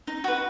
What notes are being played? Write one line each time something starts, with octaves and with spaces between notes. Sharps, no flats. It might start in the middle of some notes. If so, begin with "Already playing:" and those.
D#4
F#4 B4